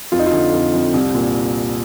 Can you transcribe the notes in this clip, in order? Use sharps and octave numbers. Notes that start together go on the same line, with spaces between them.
F2 F4
D#4
F4
D3
F2
F2
C2
A#2